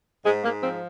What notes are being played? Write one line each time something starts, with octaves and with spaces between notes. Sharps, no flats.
G#2 G#3
G#2 A#3
F3 C4